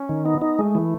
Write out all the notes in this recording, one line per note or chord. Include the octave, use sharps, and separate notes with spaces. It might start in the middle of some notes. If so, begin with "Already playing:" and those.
Already playing: C#4
D#3
B3 D#4
D#4
G#3 A3
E3